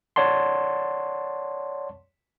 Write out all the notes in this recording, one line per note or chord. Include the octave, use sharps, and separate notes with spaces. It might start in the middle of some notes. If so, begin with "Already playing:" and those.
C#5 D5 F#5 A5 C6